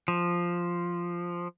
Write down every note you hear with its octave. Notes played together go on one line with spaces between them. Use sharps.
F3